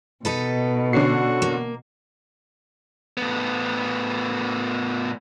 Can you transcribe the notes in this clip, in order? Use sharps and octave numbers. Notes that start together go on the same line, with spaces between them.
B2 D#4 A4 B4
D3 C#4 F#4 C7
A#3
A2 B3